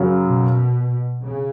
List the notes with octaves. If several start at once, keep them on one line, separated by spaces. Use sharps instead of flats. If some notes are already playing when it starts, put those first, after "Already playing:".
Already playing: F#2 C#3 F#3
B2
C#3